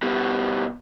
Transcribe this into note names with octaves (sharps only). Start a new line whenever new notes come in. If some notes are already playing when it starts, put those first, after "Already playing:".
B2 G3